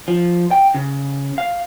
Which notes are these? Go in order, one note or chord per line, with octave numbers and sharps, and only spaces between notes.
F3
G5
C#3
F5